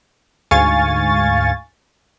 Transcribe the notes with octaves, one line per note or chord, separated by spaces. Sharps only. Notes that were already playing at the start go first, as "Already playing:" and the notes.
D2 G#2 F5 G#5 C#6 A6